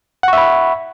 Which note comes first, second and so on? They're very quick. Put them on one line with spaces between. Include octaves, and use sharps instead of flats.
F#5 C#6 E5 B5